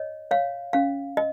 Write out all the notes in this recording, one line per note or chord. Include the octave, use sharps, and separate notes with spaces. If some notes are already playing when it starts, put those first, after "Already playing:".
Already playing: C#5 D#5
C#5 F5
C#4 F5
D#5